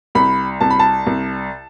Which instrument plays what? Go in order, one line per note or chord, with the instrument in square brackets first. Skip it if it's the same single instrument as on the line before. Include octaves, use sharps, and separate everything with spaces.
[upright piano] C2 B5
C2 A5
B5
A5
C2